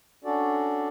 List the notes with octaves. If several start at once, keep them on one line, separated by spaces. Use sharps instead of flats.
C#4 D4 F#4 A4 D5